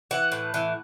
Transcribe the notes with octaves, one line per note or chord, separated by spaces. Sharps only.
E3 F#5
A2
E3